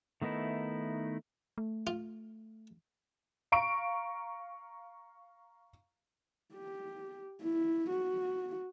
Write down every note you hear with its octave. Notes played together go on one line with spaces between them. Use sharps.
D#3 A3 B3 D#4 E4
A3
F4
F5 A#5 C#6 D7
G4
E4
F#4